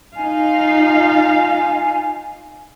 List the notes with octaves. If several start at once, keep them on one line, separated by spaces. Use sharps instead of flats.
D#4 F4 F5 G#5